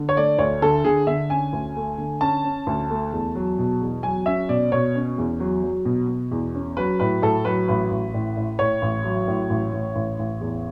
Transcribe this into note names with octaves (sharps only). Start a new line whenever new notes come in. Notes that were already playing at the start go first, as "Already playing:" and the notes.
Already playing: D3
C#5
A3 D5
D2 C#5
D3 A4
D3 G#4
D3 E5
C#4 G#5
D2
A3
D3
C#4 A5
C#4
D2
A3
E2
F#3
B2
E2
F#3 G#5
C#4 E5
B2 D5
B2 C#5
C#4
E2
F#3
F#3
B2
B2
E2
C#4
F#3 B4
A2 B4
A2 A4
F#3 B4
A1 B4
A1
A2
A2
A2 C#5
A1
F#3
A2
A1
A1
A1
A1
E2